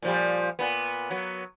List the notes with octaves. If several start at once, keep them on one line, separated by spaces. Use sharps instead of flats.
A#2 F3 G3
A#2 B3
F#3 B3